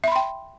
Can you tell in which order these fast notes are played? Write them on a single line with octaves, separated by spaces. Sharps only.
E5 B5 C6 G5